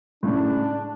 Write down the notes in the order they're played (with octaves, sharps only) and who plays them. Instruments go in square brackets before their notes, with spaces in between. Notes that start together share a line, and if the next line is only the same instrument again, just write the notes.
[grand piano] A2 C#3 [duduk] D4